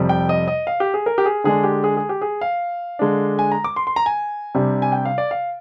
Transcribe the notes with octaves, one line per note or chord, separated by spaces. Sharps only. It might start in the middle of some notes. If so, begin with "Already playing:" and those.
Already playing: F2 C3 G3
G5
D#5
D#5
F5
G4
G#4
A#4
G4
G#4
D3 G#3 D4 G#4
G4
G#4
G#4
G4
G#4
F5
D3 G#3 D4
G#5
A#5
D6
C6
C6
A#5
G#5
C3 G3 D4
G#5
G5
F5
D5
F5